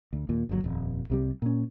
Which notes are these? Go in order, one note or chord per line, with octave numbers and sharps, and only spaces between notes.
D2
D#2 A#2
G1 D#2 D3 F#3
D#1 F2
C2 C3 G3
A#2 C#4